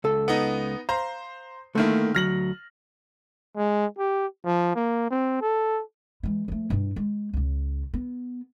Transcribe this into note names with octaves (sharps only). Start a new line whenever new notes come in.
C#2 A4
B3 D#4
C5 F5 A#5
D3 D#3 A3 A#3 E4
D2 F#3 F6 A#6 F#7
G#3
G4
F3
A#3
C4
A4
E3 G#3
F3 A3
G2 E4
G#3
C#2 C#3
B3